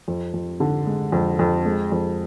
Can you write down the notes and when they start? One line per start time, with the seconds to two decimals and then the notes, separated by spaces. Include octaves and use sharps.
0.08 F2
0.34 F2
0.60 D3
0.87 G#3
1.12 F2
1.39 F2
1.65 G#3
1.92 F2